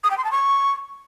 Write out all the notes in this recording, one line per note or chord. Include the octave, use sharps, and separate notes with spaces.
D#6
G5
C6
A5
C#6